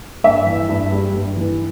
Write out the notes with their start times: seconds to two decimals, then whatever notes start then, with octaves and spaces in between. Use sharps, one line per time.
0.24 G2 E5
0.47 E3
0.69 G2
0.92 G3
1.15 G2
1.37 E3